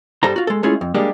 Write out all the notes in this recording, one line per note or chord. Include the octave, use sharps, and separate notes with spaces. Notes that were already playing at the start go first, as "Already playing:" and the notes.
G2 G3 A4 C5 A#5
F4 F#4
G#3 A4
G#3 A3 C#4 E4 F4 G#4
F2
G3 G#3 A#3 D4 G4